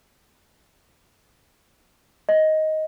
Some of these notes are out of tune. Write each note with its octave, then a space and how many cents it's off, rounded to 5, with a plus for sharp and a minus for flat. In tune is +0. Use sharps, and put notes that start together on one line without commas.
D#5 +10